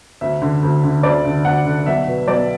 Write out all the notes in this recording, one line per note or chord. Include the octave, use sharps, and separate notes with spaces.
D2 E5
D3
D2
D3
D2 D5
D3
D2 F#5
D3
B1 E5
B2
B1 D5